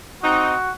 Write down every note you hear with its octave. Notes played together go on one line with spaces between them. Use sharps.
C4 D#4 F#4